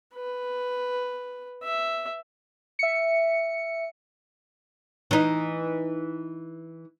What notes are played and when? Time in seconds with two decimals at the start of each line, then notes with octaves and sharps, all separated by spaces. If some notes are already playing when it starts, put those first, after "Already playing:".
0.15 B4
1.63 E5
2.79 E5 C#7
5.11 E3 D#4